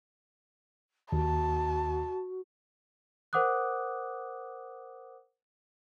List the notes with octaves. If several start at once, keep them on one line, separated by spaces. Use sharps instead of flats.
D#2 F#4 A5
A#4 C5 F#5 D6 D#6 F#6